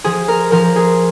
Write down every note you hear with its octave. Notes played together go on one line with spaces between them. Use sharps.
F3 G#4
A#4
F3 A#4
G#4